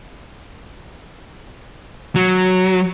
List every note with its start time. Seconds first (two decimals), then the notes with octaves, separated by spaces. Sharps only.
2.16 F#3